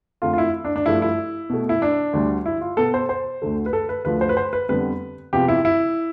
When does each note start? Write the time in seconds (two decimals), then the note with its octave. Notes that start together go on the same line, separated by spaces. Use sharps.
0.22 F2 D3 A3 F4
0.33 F4
0.38 E4
0.65 D4
0.76 D4
0.86 G2 F3 A3 E4
1.02 E4
1.50 B2 A3
1.69 E4
1.82 D4
2.13 D2 D3 G3
2.46 E4
2.61 F4
2.77 B2 B3 A4
2.94 C5
3.09 C5
3.42 D2 D3 A3
3.66 B4
3.73 A4
3.89 B4
4.05 D2 D3 F3 A3 B4
4.21 C5
4.29 B4
4.37 C5
4.53 B4
4.69 F2 D3 G3 B3 B4
5.33 E2 C3 F3 B3 G4
5.48 E4
5.65 E4